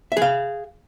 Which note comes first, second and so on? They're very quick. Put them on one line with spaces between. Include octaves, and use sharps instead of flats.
E5 G#4 F5